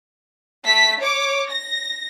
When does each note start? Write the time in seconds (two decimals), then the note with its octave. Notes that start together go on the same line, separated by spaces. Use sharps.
0.64 A3 B6
0.99 C#5 D6
1.49 A#6